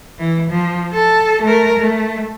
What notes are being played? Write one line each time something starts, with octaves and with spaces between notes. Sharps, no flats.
E3
F3
A4
A3 A#4
A3